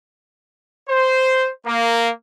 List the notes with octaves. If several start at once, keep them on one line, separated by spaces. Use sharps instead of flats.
C5
A#3